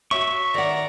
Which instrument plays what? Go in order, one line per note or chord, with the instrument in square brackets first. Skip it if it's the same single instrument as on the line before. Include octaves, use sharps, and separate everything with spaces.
[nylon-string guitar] F#4 C#5 [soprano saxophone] E5 [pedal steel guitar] C#6
[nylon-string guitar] D#3 F#5 [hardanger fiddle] D5 A#5